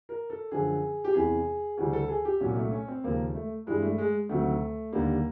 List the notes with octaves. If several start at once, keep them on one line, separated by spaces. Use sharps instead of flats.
A#4
A4
F#2 D3 F3 G#4
G4
E2 C3 E3 G#4
D2 C#3 E3 G3 G#4
A4
G#4
G4
C2 A#2 F#3 C#4
A3
C#4
C4
D#2 C#3 F3 A#3
A3
G2 E3 G3 G#3
A3
G#3
D2 C3 D#3 F#3 A3
D#2 D3 G3 A#3